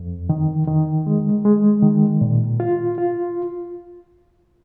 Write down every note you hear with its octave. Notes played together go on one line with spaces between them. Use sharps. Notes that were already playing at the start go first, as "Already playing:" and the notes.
Already playing: F2
D#3
D#3
G#3
G#3
D#3
A#2
F4
F4